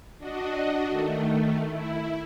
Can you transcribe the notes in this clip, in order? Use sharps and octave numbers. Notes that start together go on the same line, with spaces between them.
D4 F#4 D#5
D#3 A3
E4